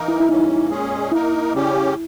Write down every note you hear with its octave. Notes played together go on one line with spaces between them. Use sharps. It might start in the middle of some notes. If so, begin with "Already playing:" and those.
Already playing: E3 A#3 D#4 A#4
E4
E4
G2 E3 A#3 C#4 D#4
A#2 G#3 C#4 G#4
A#3 D#4 E4 A#4
C#3 G3 C#4 G4